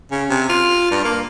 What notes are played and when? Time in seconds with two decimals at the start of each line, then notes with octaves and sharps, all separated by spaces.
0.11 C#3
0.30 C3
0.49 F4
0.91 G2
1.05 A#3